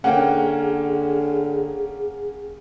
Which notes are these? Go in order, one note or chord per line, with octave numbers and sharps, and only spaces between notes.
D3 A#3 C#4 G#4 F#5 G5